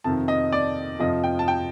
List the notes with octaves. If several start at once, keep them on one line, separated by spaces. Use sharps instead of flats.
F2 C3 D#3 A5
D#5
D5
F2 C3 F3 D#5
G5
A5
G5